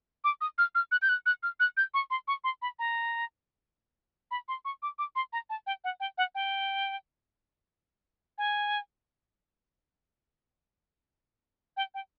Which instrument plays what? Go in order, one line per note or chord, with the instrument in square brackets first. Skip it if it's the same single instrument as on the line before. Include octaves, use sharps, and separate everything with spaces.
[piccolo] D6
D#6
F6
F6
F#6
G6
F#6
F#6
F6
F#6
G6
C#6
C6
C#6
C6
B5
A#5
B5
C6
C#6
D6
D6
C6
A#5
A5
G5
F#5
G5
F#5
G5
G#5
G5
G5